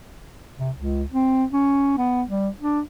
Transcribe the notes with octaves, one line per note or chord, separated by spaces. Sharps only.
C3
C#2
C4
C#4
B3
G3
D4